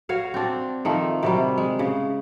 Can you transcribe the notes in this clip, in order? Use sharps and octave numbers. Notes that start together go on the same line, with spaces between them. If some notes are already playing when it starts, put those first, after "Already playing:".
F#4 C#5 F5
C4 D4
D#3 F3 A3
C3 F#3 G3
G#3
C#3